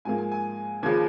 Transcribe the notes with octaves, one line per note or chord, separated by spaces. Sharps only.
G#2 F3 A#3 G#5
G#5
G#5
D#2 C#3 F3 G#6